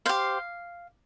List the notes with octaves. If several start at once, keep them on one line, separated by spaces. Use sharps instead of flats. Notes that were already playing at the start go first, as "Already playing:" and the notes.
G4 C5 F5